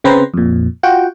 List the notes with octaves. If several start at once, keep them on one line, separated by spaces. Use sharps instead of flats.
C#3 C4 B4 C5 A#5
F2 A#2
F4 F#4 F#5 G5